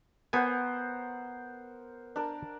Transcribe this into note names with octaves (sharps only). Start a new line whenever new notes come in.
B3 A#4 C5 F#5 G#5
D4 A#4